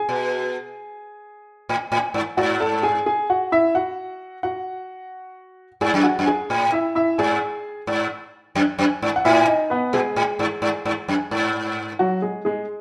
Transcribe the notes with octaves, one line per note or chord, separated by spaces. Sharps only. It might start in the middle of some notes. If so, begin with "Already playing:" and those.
Already playing: G#4 G#5
B2
A2
A2
G#2
G#2 F#4 F#5
A4 A5
G#4 G#5
G#4 G#5
F#4 F#5
E4 E5
F#4 F#5
F#4 F#5
G#2 G#4 G#5
F#2
F#4 F#5
F#2
G#4 G#5
A2
E4 E5
E4 E5
G#2 G#4 G#5
G#2
F#2
F#2
G#2
F#5
A2 E4 E5
D#4 D#5
B3 B4
B2 G#3 G#4
A2
G#2
G#2
G#2
F#2
G#2
F#3 F#4
G#3 G#4
G#3 G#4